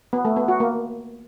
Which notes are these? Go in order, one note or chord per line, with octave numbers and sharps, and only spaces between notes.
B3
A3
B3
F#4
A#3